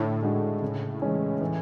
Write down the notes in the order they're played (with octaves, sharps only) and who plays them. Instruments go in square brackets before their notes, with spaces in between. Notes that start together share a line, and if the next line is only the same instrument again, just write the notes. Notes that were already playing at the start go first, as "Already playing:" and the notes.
Already playing: [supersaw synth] A2 [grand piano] D3
[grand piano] G#3 D4 F#4 A4
C#3
E3 G#3 C#4
E3